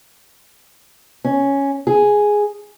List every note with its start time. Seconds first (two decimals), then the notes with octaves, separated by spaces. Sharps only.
1.24 C#4
1.87 G#4